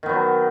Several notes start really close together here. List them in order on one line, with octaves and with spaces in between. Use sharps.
D#3 B3 F#3